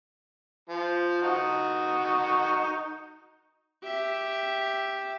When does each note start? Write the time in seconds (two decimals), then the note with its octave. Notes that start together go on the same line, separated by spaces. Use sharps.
0.69 F3
1.22 D#4 F#4 C#6
3.83 G4 E5